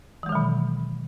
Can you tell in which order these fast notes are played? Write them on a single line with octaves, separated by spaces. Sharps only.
E3 G#3 D#3 F#3 B2